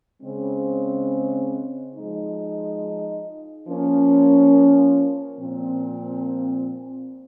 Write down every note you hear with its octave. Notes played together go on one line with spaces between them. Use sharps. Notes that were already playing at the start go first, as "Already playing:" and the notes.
C#3 G#3 C4
F3 G#3 D#4
F3 A#3 C#4
A#2 F3 C4